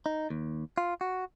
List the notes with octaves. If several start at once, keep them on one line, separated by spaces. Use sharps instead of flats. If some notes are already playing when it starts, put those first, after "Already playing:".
D#4
D#2
F4
F#4